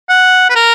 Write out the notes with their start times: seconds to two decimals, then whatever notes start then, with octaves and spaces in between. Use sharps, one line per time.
0.09 F#5
0.50 B4
0.56 A#4